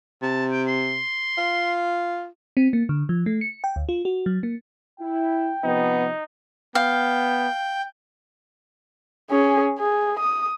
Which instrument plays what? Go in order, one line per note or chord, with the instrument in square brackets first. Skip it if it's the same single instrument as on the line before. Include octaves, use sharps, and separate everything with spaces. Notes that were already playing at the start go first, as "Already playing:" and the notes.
[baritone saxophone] C3 [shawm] A5
[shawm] G5
C6
[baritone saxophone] F4
[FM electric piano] C4
A#3
D3
F3
A3
C#7
G5
D2
F4
F#4
F#3
A#3
[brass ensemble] E4 [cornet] G5
[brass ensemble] C3 F3 [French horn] B3 [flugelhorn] D#4
[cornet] B3 [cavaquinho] F5 [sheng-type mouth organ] G5
[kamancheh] C#4 G#4
G#4
D#6